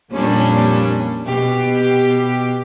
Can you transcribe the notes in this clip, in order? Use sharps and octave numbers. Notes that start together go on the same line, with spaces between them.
F2 A#2 G3 C#4 D4
B2 G4